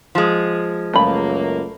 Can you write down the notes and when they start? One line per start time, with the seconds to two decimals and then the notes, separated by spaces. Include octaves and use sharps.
0.15 F3 G#3
0.94 C#2 F#2 A3 A#3 B5